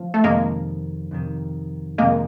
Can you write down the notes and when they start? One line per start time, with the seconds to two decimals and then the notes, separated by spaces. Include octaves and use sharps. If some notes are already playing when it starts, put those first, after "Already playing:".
Already playing: F3
0.14 A3
0.24 F2 C3 D#3 G#3 A#3
1.11 F2 C3 D#3
1.98 F2 C3 D#3 G#3 A#3